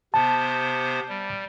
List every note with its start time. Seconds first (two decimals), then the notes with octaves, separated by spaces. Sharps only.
0.14 C3 B3 C5 A5
1.09 G3